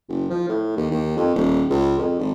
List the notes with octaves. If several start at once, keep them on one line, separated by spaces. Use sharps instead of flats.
F#1
F3
A2
D#2
D#2
F2
D#1
C#2
F2
G#1